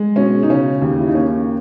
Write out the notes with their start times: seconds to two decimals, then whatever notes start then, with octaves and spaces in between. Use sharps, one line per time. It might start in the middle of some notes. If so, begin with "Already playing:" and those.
Already playing: G#3
0.16 B2 C#4
0.43 D#4
0.50 C#3 C#4
0.82 D#2
0.99 E4
1.07 D#4
1.15 A#3 C#4